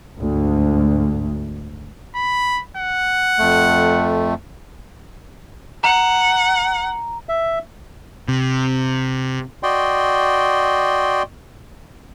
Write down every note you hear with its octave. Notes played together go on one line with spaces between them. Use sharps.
D2 G#2
B5
F#5
F2 A3
F#5 A#5
E5
C3
F#4 D5 D#5 G5 C6